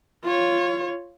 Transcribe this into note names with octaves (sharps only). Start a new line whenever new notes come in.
F4 C#5